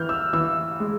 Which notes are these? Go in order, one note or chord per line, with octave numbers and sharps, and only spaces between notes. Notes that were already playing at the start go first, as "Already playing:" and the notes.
Already playing: E3 F6 G6
E6
E3 E6
G#3